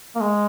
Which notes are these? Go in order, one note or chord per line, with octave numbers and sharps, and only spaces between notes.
A#3
G#3